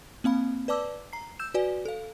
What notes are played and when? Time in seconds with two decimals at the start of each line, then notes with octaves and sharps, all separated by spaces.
0.24 A#3 C4 F5 B5
0.68 B4 D5 A5 D6 E6
1.13 A#5 C7
1.39 E6 G6 E7
1.54 F#4 B4 D5 G#5
1.85 A4 F5